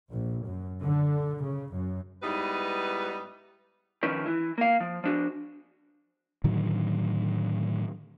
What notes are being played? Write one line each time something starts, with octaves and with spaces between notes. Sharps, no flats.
A#1
F#2
D3
C#3
F#2
G#2 G3 B3 D#4 E4 B4
D#3 F3 C#4 B4
E3 E4
A#3 F5
F3
F3 D4 F#4
A2 D3 D#3 F#3